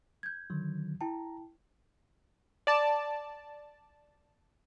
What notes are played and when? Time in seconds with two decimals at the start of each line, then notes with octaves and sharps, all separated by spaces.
0.23 G6 G#6
0.50 D3 D#3 F#3
1.01 E4 G5 A5 A#5
2.67 D5 A5